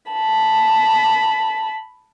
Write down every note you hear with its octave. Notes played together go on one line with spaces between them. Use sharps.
A5 B5